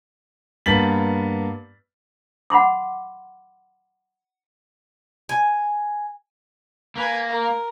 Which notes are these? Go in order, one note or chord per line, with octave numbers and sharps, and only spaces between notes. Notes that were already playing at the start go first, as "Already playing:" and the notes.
G2 A#3 B3 A6 B6 F#7
F#5 B5 C6 D6
G#5
A#3 B4 G#5
A#4